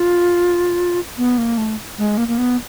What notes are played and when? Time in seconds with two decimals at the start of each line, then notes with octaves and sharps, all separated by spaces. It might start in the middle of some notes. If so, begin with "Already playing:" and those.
Already playing: F4
1.18 B3
1.38 A#3
1.58 A3
1.98 G#3
2.18 A#3
2.28 A#3
2.38 B3